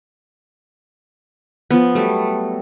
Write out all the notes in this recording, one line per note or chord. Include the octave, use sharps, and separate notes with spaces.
F3 B3
F#3 G3 A3